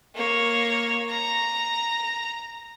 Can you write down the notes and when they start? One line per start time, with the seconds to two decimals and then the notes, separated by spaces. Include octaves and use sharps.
0.15 A#3 C#5
1.10 A#5